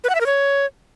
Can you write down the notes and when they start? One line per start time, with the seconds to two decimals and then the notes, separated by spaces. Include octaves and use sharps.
0.04 B4
0.09 F#5
0.15 E5
0.21 A#4
0.26 C#5